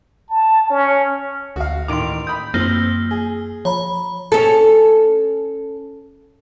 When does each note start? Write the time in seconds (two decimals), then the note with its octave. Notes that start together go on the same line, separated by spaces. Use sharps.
0.30 A5
0.70 C#4
1.56 D2 F#4 F5
1.88 A1 D#3 C6 D6 D7 F7
2.27 B5 D#6 G6
2.54 F#2 F3 A#3 C4 G7
3.11 G#4
3.65 F3 C#5 A#5 B5
4.32 C#4 A4